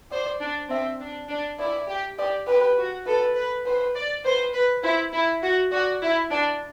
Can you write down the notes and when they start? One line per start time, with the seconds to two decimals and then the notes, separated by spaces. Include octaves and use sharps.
0.11 C5 D5
0.42 D4
0.70 C4 E5
1.00 D4
1.30 D4
1.59 E4 D5
1.88 G4
2.18 G4 D5
2.47 G4 B4
2.77 F#4
3.06 A4 B4
3.36 B4
3.66 B4 C5
3.96 D5
4.24 B4 C5
4.54 B4
4.83 E4 C5
5.13 E4
5.43 F#4
5.72 F#4 D5
6.02 E4
6.31 D4 D5